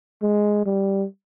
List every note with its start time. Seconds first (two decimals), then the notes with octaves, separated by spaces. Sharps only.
0.23 G#3
0.66 G3